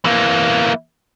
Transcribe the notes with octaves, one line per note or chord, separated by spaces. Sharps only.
E3 A#3